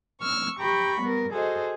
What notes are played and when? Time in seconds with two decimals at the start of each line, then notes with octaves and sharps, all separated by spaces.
0.20 C#6 E6 F6
0.58 G4 G5 A#5 B5 C#6
1.00 G3 B3 A#4
1.32 F#4 G#4 A4 C5 D#5